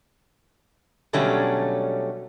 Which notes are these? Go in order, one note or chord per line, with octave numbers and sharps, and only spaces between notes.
B2 D3 F#3 G3 A3 C#4